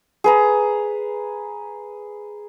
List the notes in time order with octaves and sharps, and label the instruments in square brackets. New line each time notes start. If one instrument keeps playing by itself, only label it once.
[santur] G#4 B4 A#5